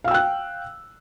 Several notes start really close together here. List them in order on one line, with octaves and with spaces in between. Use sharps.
F5 E6 G5 F#6